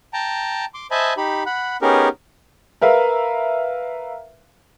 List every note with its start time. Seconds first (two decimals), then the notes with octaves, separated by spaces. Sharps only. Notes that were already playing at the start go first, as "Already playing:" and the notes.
0.13 G5 A5 A#5
0.74 C6 D6
0.91 C5 D#5 E5 G#5 A5 B5
1.17 D#4 G4 B5
1.46 F#5 B5
1.82 B3 C#4 D#4 G4 G#4 A#4
2.81 A#4 B4 E5 F5